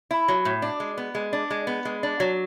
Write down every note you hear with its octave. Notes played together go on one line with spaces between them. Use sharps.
E4
F#3
A2
D4
G#3
B3
G#3
D4
G#3
B3
G#3
D4
F#3